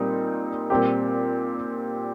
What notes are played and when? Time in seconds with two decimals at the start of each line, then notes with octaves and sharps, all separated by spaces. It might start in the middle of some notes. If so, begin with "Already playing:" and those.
Already playing: A#2 G3 C4 D#4
0.70 A#2 G3 C4 G4